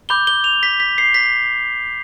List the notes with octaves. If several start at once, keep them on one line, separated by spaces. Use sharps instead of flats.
B5 D6 G6 G7
G7
F7
B6
B6
C7
B6